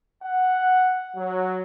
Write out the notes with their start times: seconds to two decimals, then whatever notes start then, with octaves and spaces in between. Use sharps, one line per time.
0.23 F#5
1.16 F#3